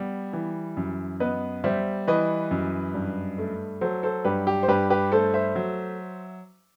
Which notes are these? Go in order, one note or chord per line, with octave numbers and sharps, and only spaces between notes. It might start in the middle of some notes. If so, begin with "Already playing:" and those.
Already playing: G3 B3
E3
F#2
B3 B4 D#5
G3 C5 E5
E3 B4 D#5
F#2
G2
A3
F#3 A4 C5
A4 C5
G2 G4 B4
G4
C5
G2 G4 B4
G4 B4
A3 A4 C5
C5 E5
F#3